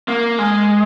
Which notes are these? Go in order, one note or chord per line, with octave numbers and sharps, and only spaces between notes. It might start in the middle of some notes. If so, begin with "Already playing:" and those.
A#3
G#3